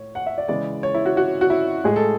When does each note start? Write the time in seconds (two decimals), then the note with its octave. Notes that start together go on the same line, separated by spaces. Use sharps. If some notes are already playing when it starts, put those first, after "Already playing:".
Already playing: A2 C#5
0.15 F#5
0.26 E5
0.38 D5
0.48 C#3 E3 G#3 D5
0.83 C#5
0.94 E4
1.06 F#4
1.17 F#4
1.41 F#4
1.50 E4
1.84 A2 G#3 G#4
1.96 A4